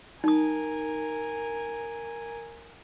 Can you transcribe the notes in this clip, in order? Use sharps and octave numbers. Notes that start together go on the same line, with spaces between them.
D#4 A#4 G#5 D#6